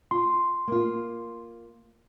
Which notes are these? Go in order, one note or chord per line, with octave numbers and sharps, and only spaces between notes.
F4 C6
A#3 F4